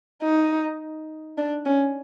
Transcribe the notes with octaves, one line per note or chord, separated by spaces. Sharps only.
D#4
D4
C#4